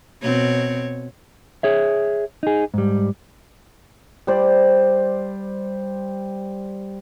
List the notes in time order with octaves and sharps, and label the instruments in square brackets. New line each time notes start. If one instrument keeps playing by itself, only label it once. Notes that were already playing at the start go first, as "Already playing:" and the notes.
[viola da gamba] B2 C4 C#5
[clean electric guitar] G#4 C#5 E5
D#4 G#4
G#2 G3
[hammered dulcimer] G3 C5 D5